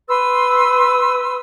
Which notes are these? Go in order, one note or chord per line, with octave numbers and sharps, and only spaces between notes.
B4 C6 E6